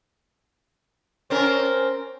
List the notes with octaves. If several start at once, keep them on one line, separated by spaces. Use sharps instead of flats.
C4 C#4 A#4